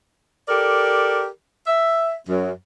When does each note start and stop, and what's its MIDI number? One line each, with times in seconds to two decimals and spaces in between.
0.49 1.27 67
0.49 1.27 69
0.49 1.27 70
0.49 1.27 74
1.67 2.15 76
2.28 2.52 42